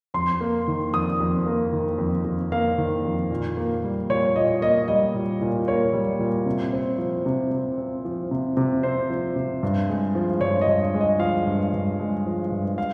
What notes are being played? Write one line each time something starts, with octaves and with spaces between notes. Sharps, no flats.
F2 C6
A#3
D#3
F2 D#6
F2
A#3
D#3
F2
F2
A#3 F5
D#3
F2
A#2
A#3
G3
A#2 C#5
A#2 D#5
A#3 D#5
G3 D#5
A#2
A#2
A#3 C#5
G3
A#2
C3
C4
F3
C3
C3
C4
F3
C3
C3
C4 C5
F3
C3
G2
G#3
F3
G2 C#5
D#5
G2
G#3
D#5
F3 F5
G2
G2
G#3
F3
G2
F5